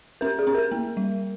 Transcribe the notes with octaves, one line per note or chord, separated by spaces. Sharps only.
C#4 A#4
G#4
C#4
A#4
A#3
G3